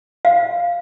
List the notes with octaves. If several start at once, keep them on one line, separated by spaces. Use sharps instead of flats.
F5